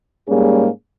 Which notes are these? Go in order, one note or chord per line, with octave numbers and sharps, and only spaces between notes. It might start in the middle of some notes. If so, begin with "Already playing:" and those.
G#2 G3 A#3 C#4 G#4